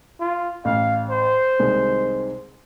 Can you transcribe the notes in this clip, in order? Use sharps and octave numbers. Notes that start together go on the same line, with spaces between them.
F4
A1 F5
C5
C2 D#3 G#3